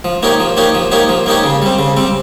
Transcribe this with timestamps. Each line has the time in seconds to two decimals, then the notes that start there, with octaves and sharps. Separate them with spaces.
0.04 F3
0.23 A#3 D#4 G4 C#5
0.40 F3
0.57 A#3 D#4 G4 C#5
0.75 F3
0.92 A#3 D#4 G4 C#5
1.09 F3
1.26 A#3 D#4 G4 C#5
1.44 C#3
1.62 G3 C4
1.79 C#3
1.97 G3 C4